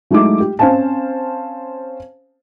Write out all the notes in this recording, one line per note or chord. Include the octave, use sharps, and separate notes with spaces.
F#3 G#3 A3 D#4 E4 D6
G4
C4 C#4 C5 F5 G#5 A5